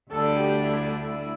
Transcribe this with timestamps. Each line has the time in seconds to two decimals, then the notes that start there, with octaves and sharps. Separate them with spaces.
0.11 D2 D3 G3 D4 A4
0.40 G4
0.68 E4